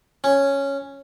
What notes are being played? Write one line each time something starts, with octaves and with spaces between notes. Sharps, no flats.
C#4